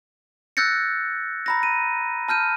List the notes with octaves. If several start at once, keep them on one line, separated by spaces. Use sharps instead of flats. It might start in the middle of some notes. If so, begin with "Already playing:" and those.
E6 F#6 G6 A6 A#6 C#7
A#5 B5 A#6
D#7
A5 F6 G6 D#7